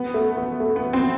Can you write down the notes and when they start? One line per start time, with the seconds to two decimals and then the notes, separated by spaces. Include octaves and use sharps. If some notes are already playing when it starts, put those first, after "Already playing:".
Already playing: B3
0.14 A3
0.37 B3
0.60 A3
0.76 B3
0.93 C4